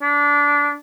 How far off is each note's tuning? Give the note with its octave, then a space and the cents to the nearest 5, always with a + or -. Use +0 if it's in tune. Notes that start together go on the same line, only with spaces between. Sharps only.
D4 -20